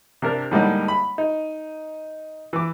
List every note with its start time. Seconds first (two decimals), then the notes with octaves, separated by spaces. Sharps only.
0.22 C3 D4 A#4
0.51 A2 D3 G3 G#3 A#3 D#4
0.88 B5
1.18 D#4
2.53 E3 D6